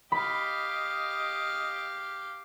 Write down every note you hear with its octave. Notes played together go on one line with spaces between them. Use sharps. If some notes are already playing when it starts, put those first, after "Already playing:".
G4 D#5 F5 B5